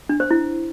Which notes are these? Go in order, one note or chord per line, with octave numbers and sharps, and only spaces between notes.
D4
C5
E4